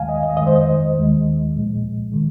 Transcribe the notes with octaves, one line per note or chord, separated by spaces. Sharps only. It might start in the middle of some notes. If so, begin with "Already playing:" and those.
Already playing: D#2 D#3 G#3 F5 G#5
D#5
D#5
F2 D#3 G#3 D#5
C5
D#5
D#2 D#3 G#3
C2 A#2 F3 G#3
D#3 G#3